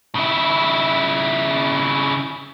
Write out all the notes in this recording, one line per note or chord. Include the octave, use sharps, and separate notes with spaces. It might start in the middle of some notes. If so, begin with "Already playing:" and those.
C#3 E4